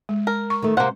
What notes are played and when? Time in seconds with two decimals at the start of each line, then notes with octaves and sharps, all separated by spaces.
0.09 G#3
0.27 A#4
0.50 C#6
0.62 D#3 A3
0.77 C3 A#3 C5 F#5